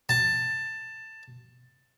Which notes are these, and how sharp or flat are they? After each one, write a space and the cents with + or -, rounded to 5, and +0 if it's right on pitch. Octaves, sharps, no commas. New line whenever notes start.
A5 +10